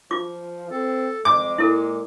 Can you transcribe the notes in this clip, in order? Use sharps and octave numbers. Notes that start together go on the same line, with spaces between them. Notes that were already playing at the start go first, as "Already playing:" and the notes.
F3 F4 D6
C4 A4
F2 G#3 D6
A#2 E4 A4